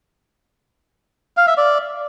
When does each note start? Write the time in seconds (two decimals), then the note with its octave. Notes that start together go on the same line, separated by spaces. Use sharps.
1.37 F5
1.47 E5
1.58 D5